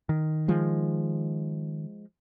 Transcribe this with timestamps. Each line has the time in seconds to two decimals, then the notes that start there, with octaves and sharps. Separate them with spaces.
0.09 D#3
0.48 F3 G#3